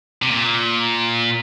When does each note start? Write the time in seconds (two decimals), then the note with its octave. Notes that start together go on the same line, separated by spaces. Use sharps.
0.22 C3
0.31 A#2